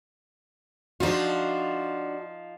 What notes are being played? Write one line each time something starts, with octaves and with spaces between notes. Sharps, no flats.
F3 D4 D#4 F4 F#4